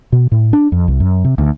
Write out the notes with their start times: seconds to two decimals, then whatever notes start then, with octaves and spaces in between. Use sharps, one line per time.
0.12 B2
0.32 A2
0.53 D4
0.72 F2
0.88 C2
1.00 F#2
1.24 C3
1.38 D2